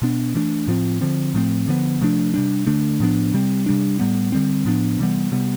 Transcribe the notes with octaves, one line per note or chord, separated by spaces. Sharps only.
B2 B3 D4
E3 A3 D4
A2 F3 C4
D3 F3 C4
A2 F3 A3 C4
D3 F3 B3
C3 F3 A3 D4
C3 G3 D4
D3 A3 D4
A2 F3 B3 D4
C3 G3 C4
C3 G3 D4
A2 G3 B3
D3 G3 C4
A2 F3 B3 D4
C3 E3 G3 B3
C3 G3 B3